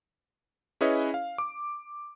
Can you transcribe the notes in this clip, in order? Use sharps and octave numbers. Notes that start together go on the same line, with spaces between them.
C#4 E4 G#4 B4 C#5 D#5
F5
D6